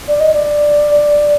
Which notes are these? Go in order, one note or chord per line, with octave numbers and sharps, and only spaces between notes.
D5
D#5
D5